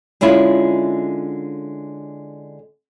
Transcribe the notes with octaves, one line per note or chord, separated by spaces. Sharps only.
D3 G#3 C#4 E4 F4